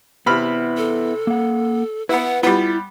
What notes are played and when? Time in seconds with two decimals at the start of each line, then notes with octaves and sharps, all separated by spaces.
0.26 C3 B3 E4 B5 F6
0.77 A4
1.27 A#3 F#5
2.09 B3 E4 B4 F#5
2.43 G3 B3 E4 F4